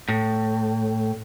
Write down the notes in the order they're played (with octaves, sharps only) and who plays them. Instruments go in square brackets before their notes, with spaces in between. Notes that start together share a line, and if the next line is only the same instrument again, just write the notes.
[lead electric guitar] A2